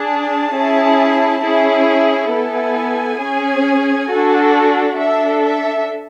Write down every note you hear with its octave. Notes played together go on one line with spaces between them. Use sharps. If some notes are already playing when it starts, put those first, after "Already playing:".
Already playing: D4 G#4 A5
C#4 E4 G#4
C#4 E4 G#4
B3 E4 A4 G#5
C#4 G#4
D4 F#4 A4
D4 A4 E5
E5